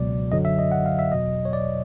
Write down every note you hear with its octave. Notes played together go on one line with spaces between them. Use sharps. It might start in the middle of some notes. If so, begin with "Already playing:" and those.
Already playing: C#2 B2 F#3 D5
F#2 D3 F#3 D#5
E5
D#5
F#5
F5
E5
E2 B2 F#3 D#5
C#5
D5